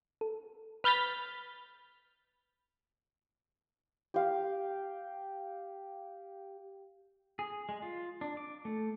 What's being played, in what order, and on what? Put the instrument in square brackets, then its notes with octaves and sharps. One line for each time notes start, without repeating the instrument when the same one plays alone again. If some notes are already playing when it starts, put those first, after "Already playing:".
[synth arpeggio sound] A4
[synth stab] B4 F6 G6 A6 B6
[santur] G4 F5
[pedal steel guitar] G#4
G#3
F4
D4
D6
A3